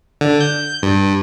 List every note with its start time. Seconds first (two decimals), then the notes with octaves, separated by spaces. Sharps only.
0.21 D3
0.41 G6
0.83 G2